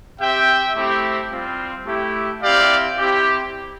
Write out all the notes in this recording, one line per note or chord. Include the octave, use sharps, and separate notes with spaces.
C4 G4 E5 G5
A3 C4 E4 G4
G3 C4 F4
A3 E4 G4
C4 E4 G4 D5 F5
C4 E4 G4